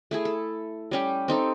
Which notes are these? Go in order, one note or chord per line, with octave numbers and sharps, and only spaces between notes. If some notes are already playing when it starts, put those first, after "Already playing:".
A3 E4 G#4
A4
G3 C#4 G4
C4 D#4 A4